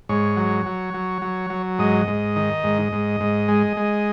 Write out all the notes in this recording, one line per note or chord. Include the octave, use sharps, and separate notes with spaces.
G#2 C#5
F#3
F#3
F#3
F#3
F#3
G#2 D#5
G#2
D#3
G#2
G#2
G#2
G#3
G#3